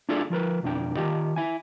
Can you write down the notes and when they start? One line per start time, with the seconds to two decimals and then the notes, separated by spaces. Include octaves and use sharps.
0.09 D4 E4 F4 G#4 A4 D5
0.30 F3 F4 A#4 B4
0.63 B1 F2 D4 G5
0.96 D#3 F4 G4 D#5
1.36 E4 G#5